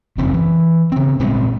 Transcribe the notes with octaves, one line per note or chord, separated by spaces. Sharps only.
F#1 F2 C#3 C4
E3
C#3 C4
A#2 G3 G#3 C4